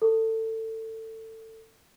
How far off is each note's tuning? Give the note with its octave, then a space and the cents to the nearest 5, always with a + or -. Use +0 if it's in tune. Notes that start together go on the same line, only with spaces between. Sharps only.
A4 +25